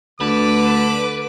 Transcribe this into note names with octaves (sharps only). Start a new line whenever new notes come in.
D2 D3 B4 D6